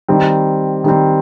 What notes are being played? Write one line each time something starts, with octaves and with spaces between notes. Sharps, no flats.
D#3 G3 C4
D#3 G3 C4